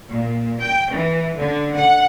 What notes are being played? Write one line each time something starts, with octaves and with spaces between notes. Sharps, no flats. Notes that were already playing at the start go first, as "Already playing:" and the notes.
A#2
G5
E3
D3
F#5